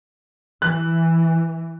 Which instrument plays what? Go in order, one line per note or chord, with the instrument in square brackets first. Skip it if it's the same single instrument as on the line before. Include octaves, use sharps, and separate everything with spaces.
[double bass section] E3 [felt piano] F#6